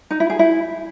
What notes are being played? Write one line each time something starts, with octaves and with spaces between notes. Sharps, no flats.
D#4
E4
G#4
E4